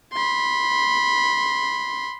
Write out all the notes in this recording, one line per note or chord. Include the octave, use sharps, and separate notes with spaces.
B5 C6